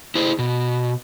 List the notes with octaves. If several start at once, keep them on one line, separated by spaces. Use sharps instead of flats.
E4 G#4 C5
B2